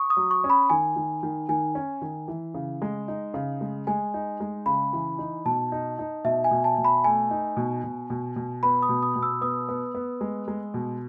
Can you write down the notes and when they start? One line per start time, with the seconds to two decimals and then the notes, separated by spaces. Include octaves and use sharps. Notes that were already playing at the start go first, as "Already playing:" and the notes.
Already playing: C#6 D#6
0.10 D#6
0.17 F#3
0.31 C#6
0.44 C#4
0.50 B5
0.70 D#3 G#5
0.96 D#3
1.23 D#3
1.49 D#3 G#5
1.75 C#4
2.02 D#3
2.28 E3
2.54 C#3
2.82 G#3
3.08 D#4
3.34 C#3
3.61 G#3
3.87 G#3 G#5
4.14 D#4
4.40 G#3
4.66 C#3 B5
4.93 E3
5.18 D#4
5.45 B2 A5
5.72 D#4
5.99 D#4
6.24 B2 E5
6.44 G#5
6.51 B2
6.64 A5
6.78 B2
6.85 B5
7.04 A3 G#5
7.31 D#4
7.57 B2
7.84 B2
8.10 B2
8.36 B2
8.63 B3 B5
8.82 D#6
8.89 B2
9.03 D#6
9.16 B2
9.23 E6
9.41 B3 D#6
9.69 B3
9.95 B3
10.21 G#3
10.48 G#3
10.74 B2